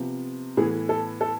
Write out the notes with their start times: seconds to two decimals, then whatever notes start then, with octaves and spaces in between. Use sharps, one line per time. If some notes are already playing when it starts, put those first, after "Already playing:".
Already playing: C3 F3 B3
0.57 A2 E3 B3 G#4
0.89 A4
1.21 A4